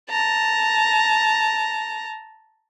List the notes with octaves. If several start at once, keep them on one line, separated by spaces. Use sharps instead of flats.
A5 A#5